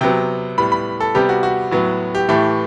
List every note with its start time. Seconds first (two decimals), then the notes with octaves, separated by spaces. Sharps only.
0.01 C3 F#3 B3 G5
0.58 A2 G3 B3 B5
0.72 B5
1.00 A4
1.15 C3 G3 B3 G4
1.29 F#4
1.43 F#4
1.71 A2 F#3 B3
2.15 G4
2.29 A2 E3 A3 G4